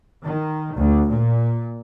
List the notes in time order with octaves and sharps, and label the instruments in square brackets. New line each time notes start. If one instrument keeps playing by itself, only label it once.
[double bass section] D#3
D2
A#2